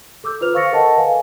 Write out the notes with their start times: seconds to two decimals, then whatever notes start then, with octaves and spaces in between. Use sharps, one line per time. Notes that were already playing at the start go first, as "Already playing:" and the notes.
0.24 A4 D6 E6 G6
0.41 F4 B4 C5 F6 F7
0.54 F5 C#6 E6 A6 A#6 C#7
0.72 A4 A#4 D#5 F#5 A5
0.97 B4 F5 G#5